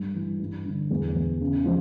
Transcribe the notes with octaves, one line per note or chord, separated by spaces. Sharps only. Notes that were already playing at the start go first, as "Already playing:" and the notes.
Already playing: G2
E3
G2
D3
E2
E2
C#3
F3